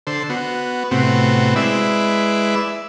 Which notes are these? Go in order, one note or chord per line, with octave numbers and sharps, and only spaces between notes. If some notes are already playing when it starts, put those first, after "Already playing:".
D3 A4 C5
B3 F#4
A2 C3 B3 C4 F#4
G#3 E4 B4 D5 E5